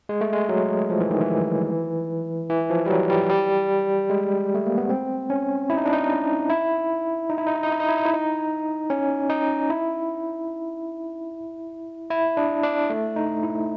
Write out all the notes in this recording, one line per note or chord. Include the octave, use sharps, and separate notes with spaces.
G#3
A3
G#3
F#3
F3
E3
D#3
E3
E3
F3
G3
F#3
G3
G3
G#3
A3
A#3
B3
C4
C#4
E4
D#4
D4
D#4
E4
D#4
E4
D#4
E4
D#4
E4
D#4
E4
D#4
E4
D#4
C#4
D#4
E4
E4
D4
D4
A3
D#4
E4